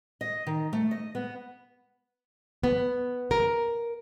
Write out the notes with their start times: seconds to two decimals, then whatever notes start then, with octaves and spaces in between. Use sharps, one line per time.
0.21 D#5
0.47 D#3
0.73 A3
0.91 D#5
1.15 B3
2.63 B3
3.31 A#4